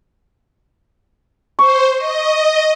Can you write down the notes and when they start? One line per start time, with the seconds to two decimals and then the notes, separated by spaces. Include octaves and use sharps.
1.59 C5 C#6
1.97 D#5